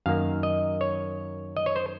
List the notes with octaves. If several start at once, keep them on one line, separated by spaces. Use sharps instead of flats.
F#2 D#3 A#3 F5
D#5
C#5
D#5
C#5
C5